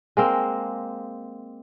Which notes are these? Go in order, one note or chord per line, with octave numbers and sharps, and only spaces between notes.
G#3 A#3 C4